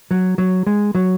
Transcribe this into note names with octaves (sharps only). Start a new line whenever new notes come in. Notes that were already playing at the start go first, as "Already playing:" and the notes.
F#3
F#3
G#3
F#3